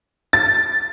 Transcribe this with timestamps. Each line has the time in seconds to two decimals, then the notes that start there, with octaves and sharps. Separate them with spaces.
0.33 A6